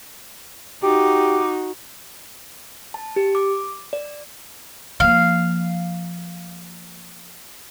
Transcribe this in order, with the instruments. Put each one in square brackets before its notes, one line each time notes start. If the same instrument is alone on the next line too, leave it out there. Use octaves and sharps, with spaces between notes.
[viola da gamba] D#4 [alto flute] F#4 [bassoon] G4 [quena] D6
[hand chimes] A5
G4
D6
D5
[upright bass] F3 A#3 [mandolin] F5